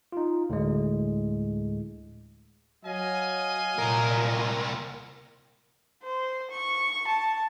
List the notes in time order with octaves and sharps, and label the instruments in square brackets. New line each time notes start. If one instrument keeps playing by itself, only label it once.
[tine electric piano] D#4 F4
D2 A2 G#3
[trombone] F#3 [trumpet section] D#5 F5 G#5
[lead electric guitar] C2 A#4 [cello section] A#2
[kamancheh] C5
C#6
A5